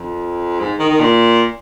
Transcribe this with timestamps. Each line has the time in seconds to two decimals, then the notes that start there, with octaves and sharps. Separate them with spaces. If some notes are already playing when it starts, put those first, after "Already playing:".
Already playing: F2
0.60 G#2
0.79 D#3
0.90 D#3
1.00 A#2